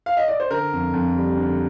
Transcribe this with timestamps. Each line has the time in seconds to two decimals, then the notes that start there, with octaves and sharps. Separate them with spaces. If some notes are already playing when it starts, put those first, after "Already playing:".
0.06 F5
0.17 D#5
0.28 D5
0.40 C5
0.50 D3 A#4
0.72 F2
0.93 F2
1.16 G3
1.37 D3